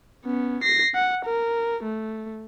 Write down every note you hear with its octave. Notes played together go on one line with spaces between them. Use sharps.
B3 C#4
A#6 C7
F#5
A#4
A3